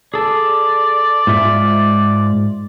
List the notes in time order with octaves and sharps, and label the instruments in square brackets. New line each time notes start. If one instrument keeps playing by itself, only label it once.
[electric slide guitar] G#4 A4 [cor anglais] D5
[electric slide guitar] G#2 F4 E5